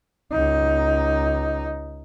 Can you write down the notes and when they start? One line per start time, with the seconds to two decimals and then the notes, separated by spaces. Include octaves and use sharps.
0.32 C#2 D#4